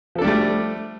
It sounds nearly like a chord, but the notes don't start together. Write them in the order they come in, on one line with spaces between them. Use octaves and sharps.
F3 A4 D4 G3 A3